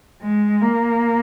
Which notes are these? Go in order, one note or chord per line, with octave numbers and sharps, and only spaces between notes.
G#3
A#3